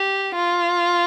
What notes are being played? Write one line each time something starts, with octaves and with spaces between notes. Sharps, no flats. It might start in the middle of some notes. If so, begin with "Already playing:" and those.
Already playing: G4
F4